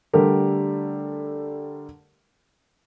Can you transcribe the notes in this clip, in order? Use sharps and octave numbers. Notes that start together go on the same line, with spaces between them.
D3 G3 A3 D4 G4 A#4